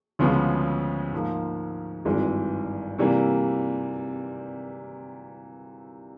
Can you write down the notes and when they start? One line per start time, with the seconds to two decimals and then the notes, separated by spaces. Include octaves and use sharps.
0.19 D2 C#3 F3 G#3 B3
1.12 G#2 F3 A#3
2.05 G#1 G2 E3 G#3
2.98 C3 E3 G3 A#3